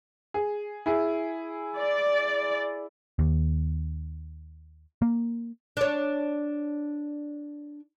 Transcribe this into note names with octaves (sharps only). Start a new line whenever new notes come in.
G#4
E4 G#4
D5
D#2
A#3
D4 C#5